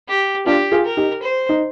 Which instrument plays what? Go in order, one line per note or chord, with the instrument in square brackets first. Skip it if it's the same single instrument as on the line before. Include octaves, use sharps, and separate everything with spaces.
[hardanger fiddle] G4
[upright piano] D4 F4 [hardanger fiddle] G4
[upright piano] F4 G#4
[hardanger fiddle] A#4
[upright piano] D#4 G4
[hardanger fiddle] C5
[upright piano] D#4